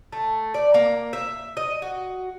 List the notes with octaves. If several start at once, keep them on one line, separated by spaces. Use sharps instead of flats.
A3
D5
A#3
E5
D#5
F#4